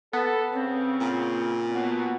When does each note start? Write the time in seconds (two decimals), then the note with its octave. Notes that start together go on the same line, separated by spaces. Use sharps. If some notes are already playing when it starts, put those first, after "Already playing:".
0.13 B3 A4
0.52 C#3 C4
1.00 A#2
1.72 B2 F#3 B3